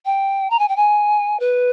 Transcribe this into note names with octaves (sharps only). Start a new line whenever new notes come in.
G5
A#5
G#5
G5
G#5
B4